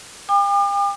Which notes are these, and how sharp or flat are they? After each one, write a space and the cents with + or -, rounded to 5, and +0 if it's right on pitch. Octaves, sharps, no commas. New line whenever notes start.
G5 +40 D6 +45